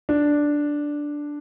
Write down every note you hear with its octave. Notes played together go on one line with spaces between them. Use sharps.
D4